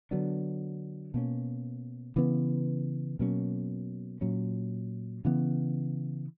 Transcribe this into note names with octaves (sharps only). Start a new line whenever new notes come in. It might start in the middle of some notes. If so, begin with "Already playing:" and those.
D3 F#3 B3 D4
B2 A#3 C#4
C#3 E3 B3
B2 F#3 A#3 C#4
A#2 F#3 C#4
C#3 E3 B3